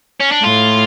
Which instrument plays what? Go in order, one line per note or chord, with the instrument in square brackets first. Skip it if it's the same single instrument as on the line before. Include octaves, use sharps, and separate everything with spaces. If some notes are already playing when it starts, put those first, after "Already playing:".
[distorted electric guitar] C#4
D4
[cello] A2 [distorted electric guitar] F4